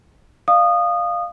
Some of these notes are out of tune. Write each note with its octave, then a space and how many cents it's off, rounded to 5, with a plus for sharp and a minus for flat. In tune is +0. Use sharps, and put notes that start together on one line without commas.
D5 +45 F5 +0 D#6 -20